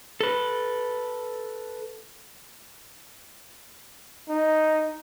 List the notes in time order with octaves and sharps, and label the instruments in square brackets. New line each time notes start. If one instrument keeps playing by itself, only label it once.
[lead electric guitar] A4 B4
[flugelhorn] D#4